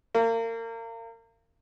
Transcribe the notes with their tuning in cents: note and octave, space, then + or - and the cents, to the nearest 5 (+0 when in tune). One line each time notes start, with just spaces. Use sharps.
A#3 -35